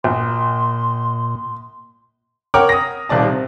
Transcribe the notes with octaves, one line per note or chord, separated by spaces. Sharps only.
A#1 A#2 C6
A#4 C#5 F#5 G5 D6 F6
D#6 A#6
D#1 C2 D5 A5
C3